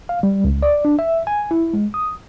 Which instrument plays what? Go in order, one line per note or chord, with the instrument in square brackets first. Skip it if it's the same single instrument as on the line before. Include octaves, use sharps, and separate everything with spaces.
[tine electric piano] F5
G3
C#2
D5
D4
E5
G#5
E4
G#3
D#6